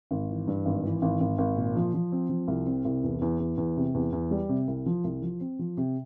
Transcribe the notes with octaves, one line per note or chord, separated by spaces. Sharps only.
G#1
E3
G2
G#1
E3
G#1
G#1
G#1
A#2
F3
F3
C4
F3
C2
C4
C2
E2
E2
E2
E2
C3
E2
E2
G3
C3
C2
F3
C2
F3
C4
F3
C3